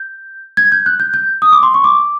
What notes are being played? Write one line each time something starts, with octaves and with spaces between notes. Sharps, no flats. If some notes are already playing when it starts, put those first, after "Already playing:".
Already playing: G6
G#6
G6
F#6
G6
G6
D#6
D6
C6
C#6
D6